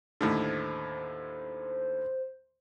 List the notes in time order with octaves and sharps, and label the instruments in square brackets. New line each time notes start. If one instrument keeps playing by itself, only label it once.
[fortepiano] D#2 A2 D3 [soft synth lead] C5